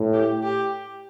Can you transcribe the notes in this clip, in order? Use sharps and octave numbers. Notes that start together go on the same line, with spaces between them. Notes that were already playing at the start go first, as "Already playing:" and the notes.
Already playing: A2
G4
G4